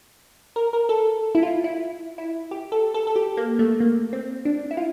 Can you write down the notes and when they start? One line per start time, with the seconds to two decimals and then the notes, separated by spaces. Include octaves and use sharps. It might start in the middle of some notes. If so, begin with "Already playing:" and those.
0.56 A#4
0.73 A#4
0.89 A4
1.35 E4
1.43 F4
1.64 E4
2.18 E4
2.51 G4
2.72 A4
2.94 A4
3.07 A4
3.16 G4
3.37 A#3
3.59 A3
3.80 A#3
4.13 C4
4.45 D4
4.71 E4
4.77 F4